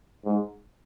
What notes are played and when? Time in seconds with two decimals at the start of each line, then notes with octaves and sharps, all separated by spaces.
0.25 G#2